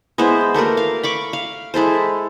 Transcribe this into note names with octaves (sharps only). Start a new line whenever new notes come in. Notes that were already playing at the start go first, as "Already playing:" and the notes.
G#3 B3 E4 C5
A3 A#3 F#4 A#4
F5
B5 C#6 D6
F5
G#3 E4 A4 C5